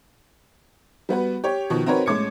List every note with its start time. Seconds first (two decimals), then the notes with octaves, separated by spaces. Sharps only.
1.09 G3 B3 F#4 B4
1.44 G4 C#5
1.70 B2 D#3 F3
1.86 C4 D#4 F#4 A#4 B4 C#5
2.06 A2 G#3 C#4 D6 G#6 C#7